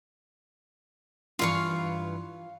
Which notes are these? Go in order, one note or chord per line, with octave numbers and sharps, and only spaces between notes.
G2 E3 F4 F5 C#6